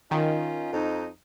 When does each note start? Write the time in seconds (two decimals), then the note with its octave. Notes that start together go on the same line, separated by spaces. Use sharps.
0.11 D#3 C#4 D#4 F4
0.73 F2 D#4